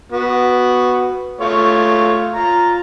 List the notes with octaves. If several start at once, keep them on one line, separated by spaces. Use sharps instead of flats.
B3 F#4
A3 F4 C#5
F4 A#5